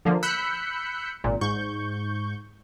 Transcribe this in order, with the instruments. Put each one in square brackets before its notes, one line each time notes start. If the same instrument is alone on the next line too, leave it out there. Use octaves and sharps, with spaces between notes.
[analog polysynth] D3 F3 A#3
B5 E6 F#6 G6 B6 C#7
G#1 A#2
G#2 C#6 G6